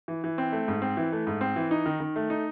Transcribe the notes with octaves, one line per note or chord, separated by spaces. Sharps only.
E3
E3
C4
A3
G#2
C4
E3
A3
G#2
C4
E3
D#4
D#3
D#3
A3
D#4